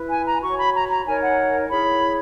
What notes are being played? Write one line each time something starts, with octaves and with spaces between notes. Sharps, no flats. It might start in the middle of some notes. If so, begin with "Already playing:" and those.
Already playing: E4 B4
G#5
A#5
F#4 C#5 C#6
B5
A#5
A#5
D#4 A#4 C#5 G#5
F#5
E4 G#4 C#5 B5